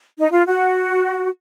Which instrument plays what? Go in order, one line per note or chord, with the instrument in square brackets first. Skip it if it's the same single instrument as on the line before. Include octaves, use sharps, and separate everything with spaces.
[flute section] D#4
F4
F#4